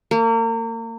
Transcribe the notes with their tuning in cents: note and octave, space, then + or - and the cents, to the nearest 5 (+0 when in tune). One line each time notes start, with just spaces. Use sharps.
A#3 -35